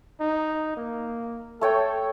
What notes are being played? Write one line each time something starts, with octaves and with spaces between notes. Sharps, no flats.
D#4
A#3
A3 A4 C#5 G5